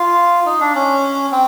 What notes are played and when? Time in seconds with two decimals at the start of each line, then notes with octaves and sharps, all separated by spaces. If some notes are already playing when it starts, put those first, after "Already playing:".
Already playing: F4
0.46 D#4
0.60 D4
0.75 C#4
1.32 C4